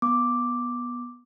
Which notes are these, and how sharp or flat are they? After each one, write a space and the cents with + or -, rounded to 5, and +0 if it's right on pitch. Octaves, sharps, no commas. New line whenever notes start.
B3 -15 D6 +0